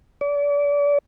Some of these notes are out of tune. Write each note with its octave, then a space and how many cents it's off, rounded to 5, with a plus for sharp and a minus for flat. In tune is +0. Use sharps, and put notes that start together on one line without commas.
D5 -35